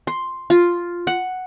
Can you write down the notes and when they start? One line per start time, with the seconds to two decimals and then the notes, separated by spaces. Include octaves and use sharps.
0.07 C6
0.50 F4
1.07 F#5